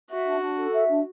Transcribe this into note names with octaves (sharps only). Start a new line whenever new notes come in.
F#4 E5
D4
D4
A4
E5
D4